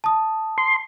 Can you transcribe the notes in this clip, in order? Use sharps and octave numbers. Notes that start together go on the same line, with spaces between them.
A5 D#6
C6